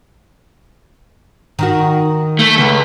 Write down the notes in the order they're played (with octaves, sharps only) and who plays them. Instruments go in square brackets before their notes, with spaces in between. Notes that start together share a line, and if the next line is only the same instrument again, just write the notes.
[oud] D#3 D#4 F#4
[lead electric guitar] A3
C#2